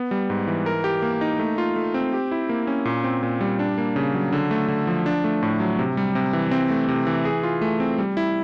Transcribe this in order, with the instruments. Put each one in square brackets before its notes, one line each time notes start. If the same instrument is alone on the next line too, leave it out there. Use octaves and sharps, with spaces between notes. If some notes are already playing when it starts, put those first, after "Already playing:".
Already playing: [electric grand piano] B3
G3
G#2
E3
A#4
G4
A#3
D#4
A3
F4
A3
C4
G4
E4
A#3
C#4
A#2
C4
A#2
G3
D4
A#3
C#3
F#3
D3
A3
D3
F3
D4
A3
A2
F#3
C3
G3
C3
E3
C4
A3
C3
E3
G#4
F4
A3
C4
G3
E4